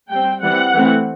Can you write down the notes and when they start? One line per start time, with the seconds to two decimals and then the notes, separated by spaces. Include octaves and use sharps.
0.10 G3 C4 G5
0.42 E3 G3 C4 F#5
0.74 E3 A3 C4